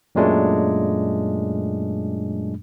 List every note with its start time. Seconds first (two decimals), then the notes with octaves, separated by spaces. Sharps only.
0.15 F#2 A#2 F#3 G#3 A3 D4